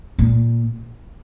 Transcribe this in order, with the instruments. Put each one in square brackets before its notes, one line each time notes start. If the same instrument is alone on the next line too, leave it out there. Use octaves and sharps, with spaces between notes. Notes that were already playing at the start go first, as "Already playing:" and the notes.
[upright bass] A#2